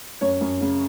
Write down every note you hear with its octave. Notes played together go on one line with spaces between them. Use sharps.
F#2 C#5
F#2
C#3